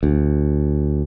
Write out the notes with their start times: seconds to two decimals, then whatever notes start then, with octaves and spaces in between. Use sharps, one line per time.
0.03 D2